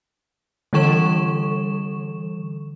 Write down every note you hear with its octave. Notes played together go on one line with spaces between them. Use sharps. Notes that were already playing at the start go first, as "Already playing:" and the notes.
D3 E3 G3 A4 C#6 E7